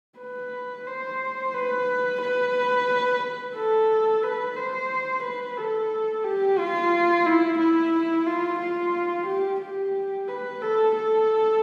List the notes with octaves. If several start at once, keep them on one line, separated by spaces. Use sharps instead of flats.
B4
C5
B4
B4
A4
B4
C5
B4
A4
G4
F4
E4
E4
F4
F4
G4
G4
B4
A4
A4